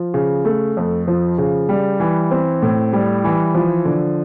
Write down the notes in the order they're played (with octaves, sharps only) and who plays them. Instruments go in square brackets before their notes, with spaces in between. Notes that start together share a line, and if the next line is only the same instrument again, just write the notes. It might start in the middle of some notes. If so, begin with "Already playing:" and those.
Already playing: [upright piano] F3
C#3
A3
F2
F3
C#3
G3
E3
C4
A2
G3
E3
F3
D3